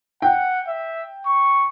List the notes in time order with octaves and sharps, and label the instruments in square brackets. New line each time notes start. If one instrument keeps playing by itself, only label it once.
[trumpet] F#5 [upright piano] G5
[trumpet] E5
C#6